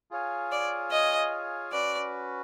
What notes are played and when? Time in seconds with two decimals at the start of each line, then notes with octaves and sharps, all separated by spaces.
0.11 F4 G#4 C#5 F5 G#5
0.51 D5
0.91 D#5
1.72 C#4 F#4 B4 D5